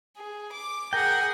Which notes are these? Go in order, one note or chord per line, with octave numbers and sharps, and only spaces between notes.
G#4
D6
G#4 A#4 F#5 G5